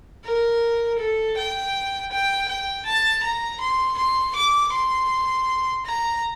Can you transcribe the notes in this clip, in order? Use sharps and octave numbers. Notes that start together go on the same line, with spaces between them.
A#4
A4
G5
G5
G5
A5
A#5
C6
C6
D6
C6
A#5